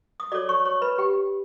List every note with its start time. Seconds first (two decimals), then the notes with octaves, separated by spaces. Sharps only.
0.20 D#6
0.32 F#4 A4 C#5 D5 D6
0.49 C#5 C#6
0.65 C#5 C#6
0.81 B4 B5
0.98 G4 G5